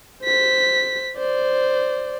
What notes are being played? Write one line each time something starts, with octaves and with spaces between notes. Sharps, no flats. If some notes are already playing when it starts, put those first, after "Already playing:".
C5 B6
C5 D5